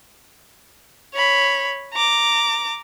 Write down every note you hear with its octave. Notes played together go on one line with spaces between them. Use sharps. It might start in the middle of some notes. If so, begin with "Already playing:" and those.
C#5 B5
A#5 D6